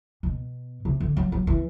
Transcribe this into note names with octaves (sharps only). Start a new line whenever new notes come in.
B2
C3
D3
F#3
F#3
E3